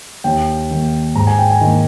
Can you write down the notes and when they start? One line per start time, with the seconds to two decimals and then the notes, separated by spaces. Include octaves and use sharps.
0.24 D#2 G5
0.70 D#3 A#3
1.15 G#2 A#5
1.27 G#5
1.39 G5
1.50 G#5
1.61 D#3 A#3